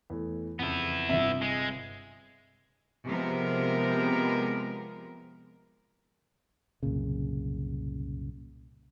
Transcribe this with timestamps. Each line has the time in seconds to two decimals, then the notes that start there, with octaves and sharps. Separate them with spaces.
0.10 E2 A3
0.59 F2 C#3 B3 E4
1.09 G1 C3 E5
1.42 G#3
3.06 C3 F3 G#3 B3 A#4
6.83 C2 F#2 A#2 C#3